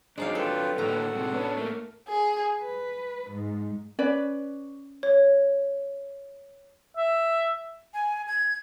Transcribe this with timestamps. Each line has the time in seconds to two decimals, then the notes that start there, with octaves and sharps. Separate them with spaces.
0.18 F#3 G#3 D4 D#4 C5 D5 F5
0.35 F4 G4 A4 B4
0.78 A2 D3 A#3 F#4 G4 A4 F#5 A#5
1.15 C3 G#3
1.33 B3 C#4 D4
1.57 A3 A#3 A#4
2.08 G#4
2.60 B4
3.31 G#2
3.99 C#4 B4 D5
5.03 C#5
6.97 E5
7.94 G#5
8.28 G#6